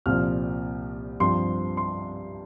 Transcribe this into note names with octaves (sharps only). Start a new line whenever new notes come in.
C2 A#2 F3 F6
G2 F3 C4 C6
C6